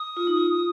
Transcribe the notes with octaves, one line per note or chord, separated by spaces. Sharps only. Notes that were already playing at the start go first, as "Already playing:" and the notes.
Already playing: D#6
F4
D#4
F4